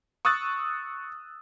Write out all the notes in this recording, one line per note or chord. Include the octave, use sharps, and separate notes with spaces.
C#6 D#6 E6 F#6 A6